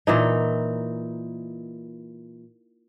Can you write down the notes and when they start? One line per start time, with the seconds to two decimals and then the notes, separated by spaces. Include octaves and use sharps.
0.07 A#2 E3 D#4